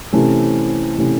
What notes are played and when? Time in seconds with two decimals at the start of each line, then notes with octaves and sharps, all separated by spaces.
0.13 C3 E3 A3 C#4
0.98 C3 E3 A3 C#4